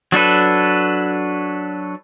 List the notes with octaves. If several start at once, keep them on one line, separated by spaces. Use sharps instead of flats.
F#3 D4 A4 B4